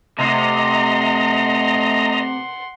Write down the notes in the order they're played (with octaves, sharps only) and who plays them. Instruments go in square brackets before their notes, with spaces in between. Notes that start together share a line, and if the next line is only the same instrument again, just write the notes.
[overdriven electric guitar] C3 [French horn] A3 [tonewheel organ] D#5 A#5 [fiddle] F#5 C6